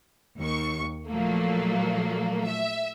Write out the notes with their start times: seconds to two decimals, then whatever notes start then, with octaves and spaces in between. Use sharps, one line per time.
0.39 D#2 C#6
1.07 A#2 F3 F#3 A3 A#3
2.46 E5